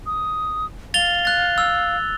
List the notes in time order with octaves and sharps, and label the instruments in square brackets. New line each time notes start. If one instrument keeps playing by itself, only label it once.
[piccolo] D#6
[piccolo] F5 [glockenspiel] A6 F7 G7
[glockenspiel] F#6 A6
E6